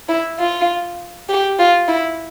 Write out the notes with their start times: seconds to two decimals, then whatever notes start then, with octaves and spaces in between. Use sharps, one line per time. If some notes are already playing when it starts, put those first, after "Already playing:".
0.09 E4
0.39 F4
1.29 G4
1.59 F4
1.88 E4